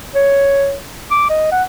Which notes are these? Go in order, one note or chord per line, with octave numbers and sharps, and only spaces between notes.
C#5
D6
D#5
F#5